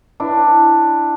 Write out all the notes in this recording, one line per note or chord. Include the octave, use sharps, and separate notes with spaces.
D4 E4